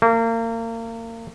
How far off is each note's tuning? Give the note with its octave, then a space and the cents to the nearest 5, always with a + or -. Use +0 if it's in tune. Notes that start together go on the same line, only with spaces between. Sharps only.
A#3 -35